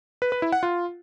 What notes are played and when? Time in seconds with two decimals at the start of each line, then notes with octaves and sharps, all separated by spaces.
0.22 B4
0.32 B4
0.42 E4
0.52 F#5
0.63 F4